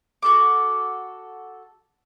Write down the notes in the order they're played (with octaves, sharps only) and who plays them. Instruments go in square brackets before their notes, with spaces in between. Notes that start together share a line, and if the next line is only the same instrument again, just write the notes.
[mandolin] F#4 A4 D6